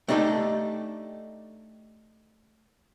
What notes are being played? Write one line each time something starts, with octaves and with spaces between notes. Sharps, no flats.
A3 D4 D#4 F#4 G4 A4